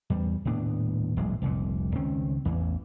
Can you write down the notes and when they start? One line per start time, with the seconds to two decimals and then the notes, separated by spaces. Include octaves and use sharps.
0.10 E2 G3
0.45 D#1 A2 B3 D4
1.17 D#1 A1 F#3 G#3
1.42 F1 C2 A#2
1.95 C#2 D#3 C4 C#4
2.45 A1 E2 E3